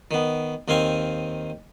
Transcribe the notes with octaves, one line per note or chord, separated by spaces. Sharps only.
D#3 B3
D#2 D#3 C4 F5 G#5